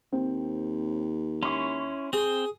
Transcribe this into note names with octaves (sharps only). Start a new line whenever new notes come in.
D#2 C4
C#4 E4 C6 C#6
C4 G#4 G5